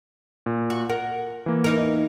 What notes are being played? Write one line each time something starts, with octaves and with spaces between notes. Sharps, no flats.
A#2
F#4
A#4 F#5
E3 A#3
E2 D#4 A#4